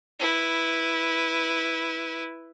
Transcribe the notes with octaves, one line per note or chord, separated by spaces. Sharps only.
E4 B4